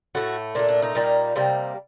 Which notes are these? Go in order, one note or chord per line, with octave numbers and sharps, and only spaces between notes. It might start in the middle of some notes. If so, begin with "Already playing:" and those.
A2 A3 F#4
A#2 A3 D4
D4
D#4
A#2 G3 A#3
C3 G3 A#3